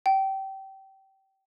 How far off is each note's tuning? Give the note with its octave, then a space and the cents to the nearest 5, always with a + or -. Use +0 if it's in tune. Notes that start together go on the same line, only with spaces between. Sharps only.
G5 -25